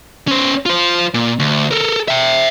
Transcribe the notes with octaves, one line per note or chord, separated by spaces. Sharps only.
C#4 C5
F4 C5
A#2
D2
A4 A#4
E5 G5